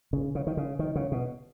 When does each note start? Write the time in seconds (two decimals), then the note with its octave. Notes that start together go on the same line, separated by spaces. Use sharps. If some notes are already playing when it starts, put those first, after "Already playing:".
0.13 C#3
0.35 C#3
0.47 D#3
0.57 C#3
0.79 D#3
0.95 C#3
1.12 B2